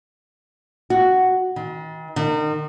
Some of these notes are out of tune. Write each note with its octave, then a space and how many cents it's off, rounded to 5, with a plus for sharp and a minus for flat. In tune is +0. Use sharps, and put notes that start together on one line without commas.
F#4 +5
D#3 +45
D#3 -35